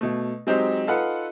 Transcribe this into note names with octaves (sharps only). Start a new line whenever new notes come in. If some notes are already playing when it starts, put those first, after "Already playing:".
B2 A3
F#3 G#3 C4 D#4 G4
D#4 F4 A4 B4 F#5